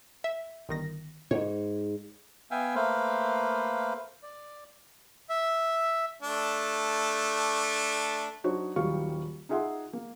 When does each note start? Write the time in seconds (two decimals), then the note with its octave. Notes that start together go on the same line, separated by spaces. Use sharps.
0.24 E5
0.69 G1 D#3 A#6
1.31 G#2 C#5
2.51 B3 E5 F5 G5 G#5
2.75 A3 A#3 B4 C5 F5
4.23 D5
5.29 E5
6.22 A3 D4
8.44 F#3 D4 D#4 F#4 C5 C#5
8.76 D#1 D#3 F#3 G3 F5 C#6
9.49 D#4 F4 G#4 E5 F#5 C6
9.93 A#3